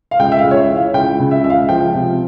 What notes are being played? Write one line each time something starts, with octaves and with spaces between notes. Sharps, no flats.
F5
C#2 G5
E5
F5
C#2
C#5
E5
E3
F5
C#2 G5
C#3
E5
C#2 E5
F5
F3 G5
C3